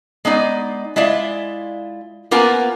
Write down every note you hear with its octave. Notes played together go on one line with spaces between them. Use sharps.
G#3 B3 D#4 D5
G#3 E4 F4 D5 E5
A#3 B3 F4 A#4 G#5